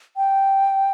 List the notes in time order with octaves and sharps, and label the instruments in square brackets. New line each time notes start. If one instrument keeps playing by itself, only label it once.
[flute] G5